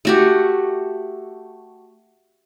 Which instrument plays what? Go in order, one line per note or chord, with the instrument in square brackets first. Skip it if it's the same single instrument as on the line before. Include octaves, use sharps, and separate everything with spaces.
[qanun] A3 F#4 G4